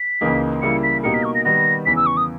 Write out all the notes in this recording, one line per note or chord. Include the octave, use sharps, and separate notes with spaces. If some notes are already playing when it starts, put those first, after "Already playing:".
Already playing: B6
C#2 C#3 E3 A#3 D#4
C#3 G3 A#3 E4 C#7
B6
B2 A#3 D#4 G4 A#4 C#7
B6
C#6
A#6
D#3 G3 B3 A#6
E2 C#3 E3 B6
E6
C#6
D#6